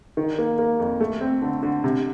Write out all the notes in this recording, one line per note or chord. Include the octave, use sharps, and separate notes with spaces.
D#3
A#3
A#3
F2
A3
C4
D3
D3
C3